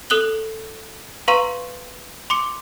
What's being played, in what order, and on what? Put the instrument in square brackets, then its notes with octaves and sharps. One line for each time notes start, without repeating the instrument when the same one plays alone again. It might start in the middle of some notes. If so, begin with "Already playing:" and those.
[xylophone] A4 D#6 F#6 F#7 G7
B4 F5 A#5 C6 C#6 D#7
C6 D6 C#7